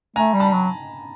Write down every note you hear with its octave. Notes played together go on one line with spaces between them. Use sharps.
A3 G#5 A#5
G3
A5 B5
F#3